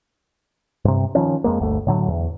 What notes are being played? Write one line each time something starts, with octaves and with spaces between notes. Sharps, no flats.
G2 C3
D#3 F3 C#4
F2 G#3 A#3
G1 D2 A3
A2 D3 F#3
E2